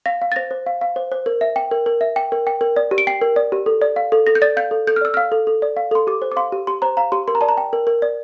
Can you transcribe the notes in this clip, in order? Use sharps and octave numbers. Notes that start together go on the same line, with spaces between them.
F5 A#6
F5
A6
C5 A#6
C5
F5
F5
C5
C5
A#4
E5
G5
A#4
A#4
E5
G5
A#4
G5
A#4
D5
G4
D7
G5 C7
A#4
D5
G4
A4
D5
F5
A4
A4 A#6
G6
D5 A6
F5 G6
A4
A4 G6
F6
D5 E6
F5 F6
A4
A4
D5
F5
A4 C6
G4 D6
C5
D6
F5 C6
G4
G4 C6
C5 A#5
F5 A#5
G4 C6
A#4 C6
A#5
D5 A5
A#5
G5
A#4
A#4
D5